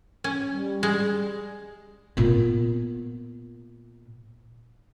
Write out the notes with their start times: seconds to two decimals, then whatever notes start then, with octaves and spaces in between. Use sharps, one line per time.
0.24 C#4
0.52 G3
0.83 G#3
2.17 A#2 B3